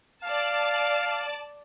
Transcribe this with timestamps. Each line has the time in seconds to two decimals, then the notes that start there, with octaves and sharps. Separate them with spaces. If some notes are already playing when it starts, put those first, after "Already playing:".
0.24 D5 F5 A5